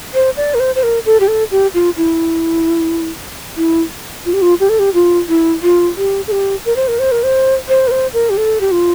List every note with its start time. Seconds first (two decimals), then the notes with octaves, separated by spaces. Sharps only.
0.14 C5
0.37 D5
0.54 A#4
0.60 C5
0.75 C5
0.83 A#4
1.05 A4
1.20 G4
1.28 A4
1.51 G4
1.74 F4
1.97 E4
3.57 E4
4.26 F4
4.33 G4
4.42 F4
4.60 G4
4.69 A4
4.79 G4
4.94 F4
5.28 E4
5.62 F4
5.97 G4
6.27 A4
6.32 G4
6.65 A#4
6.76 C5
6.88 A#4
6.99 C5
7.11 A#4
7.23 C5
7.68 C5
7.87 A#4
7.91 C5
8.13 A#4
8.30 G4
8.37 A4
8.60 G4
8.71 F4